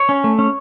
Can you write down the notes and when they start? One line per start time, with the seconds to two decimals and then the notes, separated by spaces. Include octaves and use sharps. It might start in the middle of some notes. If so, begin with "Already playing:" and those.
Already playing: C#5
0.09 C#4
0.24 A3
0.39 C#4